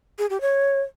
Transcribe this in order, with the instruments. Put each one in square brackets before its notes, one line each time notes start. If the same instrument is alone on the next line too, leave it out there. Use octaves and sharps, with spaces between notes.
[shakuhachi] G#4
G4
C#5